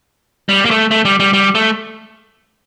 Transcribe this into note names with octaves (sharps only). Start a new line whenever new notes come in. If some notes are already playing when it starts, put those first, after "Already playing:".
G3
A#3
A3
A3
G3
G3
G3
A3